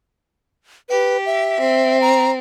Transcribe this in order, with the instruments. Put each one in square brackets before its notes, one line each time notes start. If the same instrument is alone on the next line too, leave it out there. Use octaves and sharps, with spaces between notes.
[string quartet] G4 [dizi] B4
[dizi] E5
[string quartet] C4
[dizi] A#5